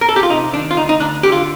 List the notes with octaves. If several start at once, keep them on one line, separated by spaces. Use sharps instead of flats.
A#4
A4
G4
F4
C3 D#4
D#3 D4
F4
D2 D#4
D#4
D2 D4
D3 G4
F4